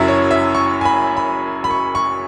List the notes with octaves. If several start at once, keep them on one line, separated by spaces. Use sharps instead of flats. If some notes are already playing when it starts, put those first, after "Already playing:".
Already playing: F#1 F#2 F#3 C#4 E4 E5
C#5
E5
C#6
G#5
B5
B5
B5
C#6
C#6